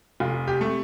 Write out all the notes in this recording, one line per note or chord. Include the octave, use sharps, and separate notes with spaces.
F1 F4
G4
C3 A3